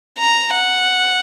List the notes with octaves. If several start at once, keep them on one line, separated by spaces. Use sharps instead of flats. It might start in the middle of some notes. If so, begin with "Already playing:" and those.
A#5
F#5